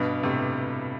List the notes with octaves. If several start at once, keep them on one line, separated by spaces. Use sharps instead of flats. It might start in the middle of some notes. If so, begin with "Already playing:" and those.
Already playing: G2 B2
A2 C3